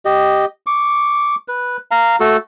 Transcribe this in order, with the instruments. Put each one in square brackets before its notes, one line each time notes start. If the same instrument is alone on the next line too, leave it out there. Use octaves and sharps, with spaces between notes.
[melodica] G4 D#5
C#6 D6
B4
F5 A#5
A3 F#4 A4